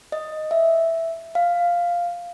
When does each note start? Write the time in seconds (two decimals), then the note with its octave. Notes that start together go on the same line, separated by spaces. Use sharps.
0.12 D#5
0.51 E5
1.35 F5